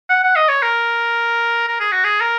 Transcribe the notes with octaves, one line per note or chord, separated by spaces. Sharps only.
F#5
F#5
D#5
C#5
A#4
A#4
G#4
F#4
G#4
A#4